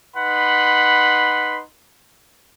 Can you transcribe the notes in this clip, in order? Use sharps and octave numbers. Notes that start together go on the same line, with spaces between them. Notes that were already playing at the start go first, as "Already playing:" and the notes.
D#4 B4 F#5 B5 C6